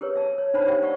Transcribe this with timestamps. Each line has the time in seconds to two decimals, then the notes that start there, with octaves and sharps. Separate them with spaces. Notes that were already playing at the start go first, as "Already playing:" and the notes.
0.01 G4 G#4 A#4 B4 C#5
0.16 E5 A5
0.38 C#5
0.54 D4 D#4 C5 C#5 A5 B5
0.67 G4 C5 E5 F5 G5
0.82 D5 E5 F#5 C#6